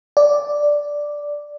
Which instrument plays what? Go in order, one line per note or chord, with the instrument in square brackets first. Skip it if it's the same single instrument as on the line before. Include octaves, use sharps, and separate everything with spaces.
[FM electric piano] D5